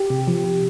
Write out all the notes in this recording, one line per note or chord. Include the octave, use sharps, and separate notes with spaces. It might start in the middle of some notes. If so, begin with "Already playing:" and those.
Already playing: G4
C3
F3
C3